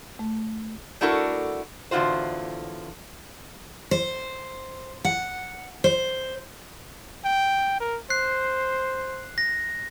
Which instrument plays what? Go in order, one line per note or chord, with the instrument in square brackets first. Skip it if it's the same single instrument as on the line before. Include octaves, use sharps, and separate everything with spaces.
[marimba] A3
[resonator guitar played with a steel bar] A3 D4 E4 F#4 A4 A#4
E2 A2 D3 F4 F#4 C5
[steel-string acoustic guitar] C5
F#5
C5
[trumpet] G5
A#4
[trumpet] C5 [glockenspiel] F#6 C7
[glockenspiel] A#6